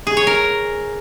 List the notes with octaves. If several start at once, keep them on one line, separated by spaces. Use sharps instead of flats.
G#4
C#5
A#4